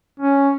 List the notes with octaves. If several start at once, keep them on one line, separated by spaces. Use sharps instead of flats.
C#4